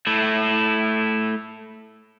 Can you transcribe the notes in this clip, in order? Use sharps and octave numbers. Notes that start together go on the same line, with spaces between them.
A3 E4